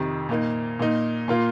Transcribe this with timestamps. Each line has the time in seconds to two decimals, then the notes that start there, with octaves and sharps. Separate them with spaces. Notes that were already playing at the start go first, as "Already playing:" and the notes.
Already playing: F2 C3 D#3
0.29 A#2 A#3 D#4
0.79 A#2 A#3 D#4
1.28 A#2 A#3 F4